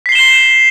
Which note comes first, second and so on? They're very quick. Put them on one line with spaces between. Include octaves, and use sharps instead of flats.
B6 C7 G7 E7